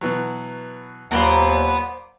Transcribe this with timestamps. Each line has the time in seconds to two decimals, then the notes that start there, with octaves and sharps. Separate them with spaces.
0.01 B2 E3 F#3
1.11 D#2 A#2 F#3 C5 D5 F#5 A#5 B5